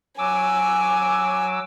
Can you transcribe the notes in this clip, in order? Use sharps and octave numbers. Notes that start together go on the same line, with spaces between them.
F#3 G#5 D6 E6